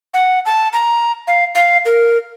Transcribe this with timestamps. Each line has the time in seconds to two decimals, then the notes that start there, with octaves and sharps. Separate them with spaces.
0.14 F#5
0.46 A5
0.73 A#5
1.27 F5
1.55 F5
1.85 A#4